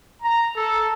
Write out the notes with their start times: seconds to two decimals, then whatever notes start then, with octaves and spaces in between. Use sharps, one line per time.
0.22 A#5
0.56 A4